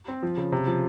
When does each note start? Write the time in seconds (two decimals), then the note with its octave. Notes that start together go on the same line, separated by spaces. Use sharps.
0.08 C4
0.23 F3
0.37 C#3
0.52 C3
0.67 F3